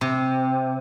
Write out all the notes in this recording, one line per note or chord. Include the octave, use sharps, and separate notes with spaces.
C3